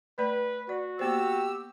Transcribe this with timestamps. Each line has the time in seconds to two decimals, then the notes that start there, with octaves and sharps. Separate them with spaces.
0.18 A3 B4 D5 B5
0.69 F#4 D5
0.99 A#3 B3 G4 C5 E6